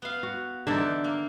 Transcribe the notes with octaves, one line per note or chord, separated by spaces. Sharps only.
B3 F5
F#4
D3 E3 D#4 D5 E5
A#3